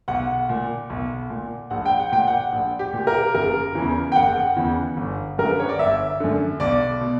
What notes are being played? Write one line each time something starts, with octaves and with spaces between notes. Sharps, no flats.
B1 F#5
A#2
B1
A#2
A#1 F#5
G5
F#5
A#2 G5
F#5
A#1
G4
A#2
A#4
F#1 A#4
E2 C#3 E3
G5
F#1 F#5
E2 C#3 E3
G1
F#2 D3 A#4
B4
C#5
D5
G1 E5
F#2 D3
B1 D5
B2